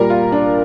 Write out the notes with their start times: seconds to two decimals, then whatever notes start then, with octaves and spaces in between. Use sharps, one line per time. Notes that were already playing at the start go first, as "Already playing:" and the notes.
Already playing: A#2 G3 A#4
0.10 F4
0.32 D4